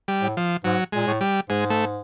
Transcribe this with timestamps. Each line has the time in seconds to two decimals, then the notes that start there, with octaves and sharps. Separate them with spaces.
0.08 G3
0.22 A2
0.37 F3
0.64 G#2 F#3
0.93 A#2 G#3
1.07 A2
1.21 G3
1.50 G#2 G#3
1.70 A3